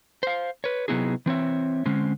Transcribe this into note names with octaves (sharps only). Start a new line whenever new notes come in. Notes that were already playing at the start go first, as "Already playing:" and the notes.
C5 F5
B4 C#5
C3 F#3 B3 D#4 E4 G#4
E3 C4 C#5 E5
D3 G#3 C4 C#4